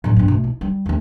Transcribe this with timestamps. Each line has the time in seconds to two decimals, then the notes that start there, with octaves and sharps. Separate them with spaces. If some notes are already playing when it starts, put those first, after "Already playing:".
0.04 A2 F#3
0.16 G2 B3
0.28 B2 A3
0.44 E4
0.61 G3
0.86 D#2 A3